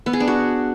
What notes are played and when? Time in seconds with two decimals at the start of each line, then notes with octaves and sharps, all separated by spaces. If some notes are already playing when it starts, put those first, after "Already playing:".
0.06 B3
0.13 G#4
0.20 D4
0.28 F#4